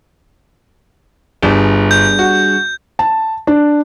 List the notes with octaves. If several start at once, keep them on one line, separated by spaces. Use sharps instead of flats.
G1 G3 D4 G#4
G6
F#4
A5
D4